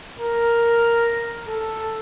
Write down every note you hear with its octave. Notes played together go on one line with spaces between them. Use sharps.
A#4
A4